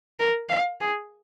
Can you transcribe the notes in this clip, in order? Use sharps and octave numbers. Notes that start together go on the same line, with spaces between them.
A#4
F5
G#4